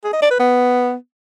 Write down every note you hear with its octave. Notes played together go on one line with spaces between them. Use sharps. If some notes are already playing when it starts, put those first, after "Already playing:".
G#4
D#5
D5
B4
B3